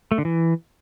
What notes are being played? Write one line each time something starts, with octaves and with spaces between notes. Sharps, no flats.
A3
D3
E3